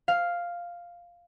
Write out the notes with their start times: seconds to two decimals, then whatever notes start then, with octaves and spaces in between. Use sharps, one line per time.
0.08 F5